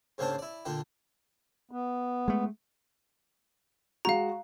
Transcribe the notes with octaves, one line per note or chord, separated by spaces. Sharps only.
G#2 C#3 A#3 C4 D4 A5
E4 D5
A#2 D3 D4 G5
B3
G#3 A3
G#3 F#4 F5 A#5